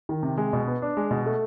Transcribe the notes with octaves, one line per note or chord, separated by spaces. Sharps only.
D#3
C3
G#3
B2
B3
D4
G#3
B2
A3